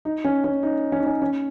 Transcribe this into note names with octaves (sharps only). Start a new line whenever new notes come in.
D#4
C#4
C#4
D#4
C#4
D#4
C#4
C#4